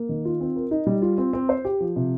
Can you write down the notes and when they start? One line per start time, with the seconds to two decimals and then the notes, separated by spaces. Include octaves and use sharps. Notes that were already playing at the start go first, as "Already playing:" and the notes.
Already playing: A#3
0.09 D#3
0.25 F4
0.40 C4
0.56 A#4
0.71 D#4
0.87 G3
1.02 F4
1.18 C4
1.33 C4
1.49 C5
1.65 G4
1.80 F3
1.96 C3